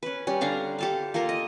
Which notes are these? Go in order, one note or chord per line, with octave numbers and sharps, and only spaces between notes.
C#4 B4
G3 C#4
D3 D4 F5 A#5
G4 A4 F5
A#3 F4 A4 A#4
D#5